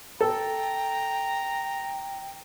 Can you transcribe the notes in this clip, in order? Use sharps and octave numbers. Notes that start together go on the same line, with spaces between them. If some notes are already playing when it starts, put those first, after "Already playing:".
A4 G5 A#5